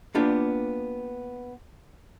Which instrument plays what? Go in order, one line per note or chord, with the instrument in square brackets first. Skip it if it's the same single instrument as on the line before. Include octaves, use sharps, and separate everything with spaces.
[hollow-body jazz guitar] A#3 B3 D4 F4 G4